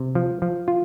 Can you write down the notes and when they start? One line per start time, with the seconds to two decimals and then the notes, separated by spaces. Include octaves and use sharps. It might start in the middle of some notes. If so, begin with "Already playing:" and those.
Already playing: C3
0.15 F3
0.42 F3
0.68 F4